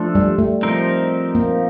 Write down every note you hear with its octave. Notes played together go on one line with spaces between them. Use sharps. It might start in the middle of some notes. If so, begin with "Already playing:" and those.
Already playing: F3 A3 D4 A4
G3
A3
F3 C4 D#4 A#4
A#3